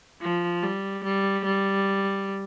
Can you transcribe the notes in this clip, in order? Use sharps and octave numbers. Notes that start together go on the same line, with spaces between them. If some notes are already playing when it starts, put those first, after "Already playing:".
F3
G3
G3
G3